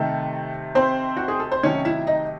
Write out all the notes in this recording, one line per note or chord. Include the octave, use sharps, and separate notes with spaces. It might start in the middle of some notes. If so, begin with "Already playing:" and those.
Already playing: C3 D#3 A3 A4
C4 C5
F#4
G#4
A4
C5
C3 D#3 F#3 A3 C#4 C#5
E4 E5
D#4 D#5